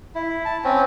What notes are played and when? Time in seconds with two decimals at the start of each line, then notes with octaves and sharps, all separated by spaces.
0.15 E4
0.45 A5
0.64 C4 C#4